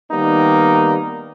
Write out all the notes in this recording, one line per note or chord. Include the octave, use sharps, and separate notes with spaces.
D#3 G3 A#3 B3 D#4